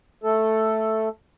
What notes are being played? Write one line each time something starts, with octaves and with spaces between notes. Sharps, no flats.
A3 A4